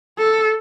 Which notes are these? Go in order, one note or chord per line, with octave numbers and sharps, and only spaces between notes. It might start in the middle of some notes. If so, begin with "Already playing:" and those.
A4